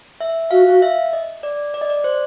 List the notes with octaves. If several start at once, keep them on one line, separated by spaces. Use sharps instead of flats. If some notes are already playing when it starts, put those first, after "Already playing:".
E5
F#4 F5
F#4 F5
E5
D#5
D5
D5
D#5
D5
C5